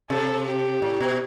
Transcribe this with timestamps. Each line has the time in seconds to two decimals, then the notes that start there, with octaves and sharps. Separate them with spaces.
0.10 C3 A4
0.46 G4
0.82 A2
1.00 B2